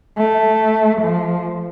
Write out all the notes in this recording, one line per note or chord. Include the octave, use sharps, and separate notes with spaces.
A3
F3